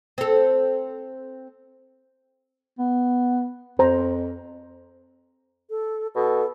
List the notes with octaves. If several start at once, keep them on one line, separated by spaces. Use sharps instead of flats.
C4 A4
B3
F2 C5 A#5
A4
B2 A4